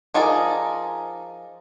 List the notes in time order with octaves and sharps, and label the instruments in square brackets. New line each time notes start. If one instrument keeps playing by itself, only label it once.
[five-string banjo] F3 D#4 G#4 A#4 D5